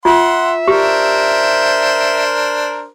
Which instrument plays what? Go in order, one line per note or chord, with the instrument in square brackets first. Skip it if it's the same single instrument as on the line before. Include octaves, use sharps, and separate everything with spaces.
[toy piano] F4 [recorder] E5 [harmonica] F#5 C6
[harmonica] D4 A#4 C5 [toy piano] G4